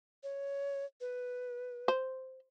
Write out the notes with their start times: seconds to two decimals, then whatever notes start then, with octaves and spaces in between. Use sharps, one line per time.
0.23 C#5
1.01 B4
1.88 C5